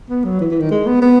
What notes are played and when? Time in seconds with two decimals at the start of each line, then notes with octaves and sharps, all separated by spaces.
0.09 B3
0.24 F#3
0.40 E3
0.51 E3
0.60 D#3
0.71 G#3
0.86 B3
1.02 B3